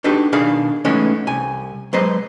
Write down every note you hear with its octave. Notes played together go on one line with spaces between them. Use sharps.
D4 D#4 F#4 G4 A4 B4
B2 D#3 D4 G#4 F5 B5
E3 G#3 A3 B3 C#4 D#4
C2 G#5
F#3 G#3 B4 C5 D#5